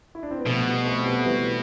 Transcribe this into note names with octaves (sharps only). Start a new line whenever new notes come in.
E4
D4
C4
B3
B2 F3 A3
G3 B3
A3 C4
C4
G3 B3
A3
E3 G3
B3